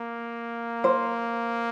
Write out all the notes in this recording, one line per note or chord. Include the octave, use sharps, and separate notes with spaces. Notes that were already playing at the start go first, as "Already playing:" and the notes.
Already playing: A#3
C5